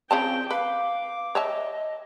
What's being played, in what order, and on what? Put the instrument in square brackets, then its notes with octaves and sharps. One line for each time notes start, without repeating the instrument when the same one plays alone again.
[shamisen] C#3 F3 A5 [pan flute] C4 [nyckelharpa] G5
[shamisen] B4 [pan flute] F5 [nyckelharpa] D6
[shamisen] C#5 E5 A5 [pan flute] D#5